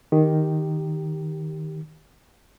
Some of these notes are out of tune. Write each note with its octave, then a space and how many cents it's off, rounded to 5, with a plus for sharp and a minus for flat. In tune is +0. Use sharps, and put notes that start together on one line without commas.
D#3 +0 G4 +0